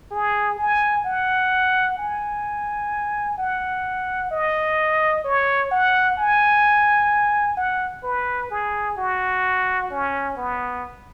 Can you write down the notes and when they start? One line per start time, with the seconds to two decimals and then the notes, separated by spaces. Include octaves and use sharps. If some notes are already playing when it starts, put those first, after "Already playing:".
0.12 G#4
0.59 G#5
1.05 F#5
1.98 G#5
3.38 F#5
4.31 D#5
5.25 C#5
5.71 F#5
6.18 G#5
7.57 F#5
8.04 B4
8.51 G#4
8.97 F#4
9.91 C#4
10.37 B3